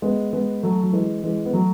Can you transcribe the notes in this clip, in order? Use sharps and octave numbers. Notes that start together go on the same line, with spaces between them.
G#3 B3
G#3 B3
F#3 A3
F#3
E3 G#3
E3 G#3
B3
F#3 A3